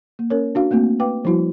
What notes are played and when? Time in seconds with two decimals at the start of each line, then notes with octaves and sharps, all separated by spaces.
0.19 A#3
0.30 C#4 A#4 C#5
0.55 D4 F#4 F5
0.71 A3 A#3 C4 F#4
1.00 B4 F5 G5 D6
1.25 F3 G3 E4 F#4